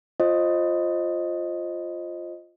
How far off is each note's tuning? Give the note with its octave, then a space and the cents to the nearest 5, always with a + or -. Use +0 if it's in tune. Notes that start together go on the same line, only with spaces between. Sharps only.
F4 +0 C5 +30 D#5 +0